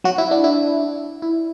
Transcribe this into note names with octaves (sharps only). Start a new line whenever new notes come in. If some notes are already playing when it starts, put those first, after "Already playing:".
F#3 F#4
E4
D4
E4
E4